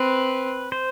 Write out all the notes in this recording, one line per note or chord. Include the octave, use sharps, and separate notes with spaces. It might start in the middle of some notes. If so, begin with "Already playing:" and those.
Already playing: C4 B4
C5